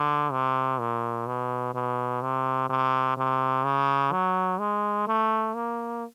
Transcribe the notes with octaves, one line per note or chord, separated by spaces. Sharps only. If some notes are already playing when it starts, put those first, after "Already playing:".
Already playing: D3
C3
A#2
B2
B2
C3
C3
C3
C#3
F#3
G#3
A3
A#3